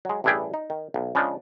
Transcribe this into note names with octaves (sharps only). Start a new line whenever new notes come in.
F#3 G#3
A1 G2 D4 E4 G#4 G5
D#4
D#3
B1
C#3 F3 G#3 D4